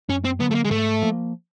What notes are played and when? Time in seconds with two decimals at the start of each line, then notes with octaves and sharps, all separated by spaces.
0.09 F#2 C#4
0.25 C4
0.40 D3 F#3 B3
0.51 A3
0.55 A#3
0.64 G#3
0.71 G#2 A3
1.02 F3 A#3